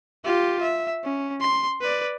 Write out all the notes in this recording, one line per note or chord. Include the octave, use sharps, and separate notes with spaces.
F4 G4
E5
C#4
C6
B4 D5